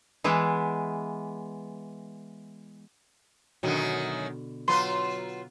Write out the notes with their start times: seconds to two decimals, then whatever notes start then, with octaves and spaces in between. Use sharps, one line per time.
0.24 E3 G#3 B3 E4
3.63 F#2 B2 D3 D#3 F#3
4.68 F#3 F4 B4 C6